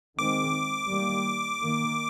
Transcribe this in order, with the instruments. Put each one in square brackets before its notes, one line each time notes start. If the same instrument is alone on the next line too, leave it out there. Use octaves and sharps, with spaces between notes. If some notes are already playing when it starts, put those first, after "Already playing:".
[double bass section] D#3 G#3 C4 [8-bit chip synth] D6
[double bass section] D#3 G3 A#3
D#3 A#3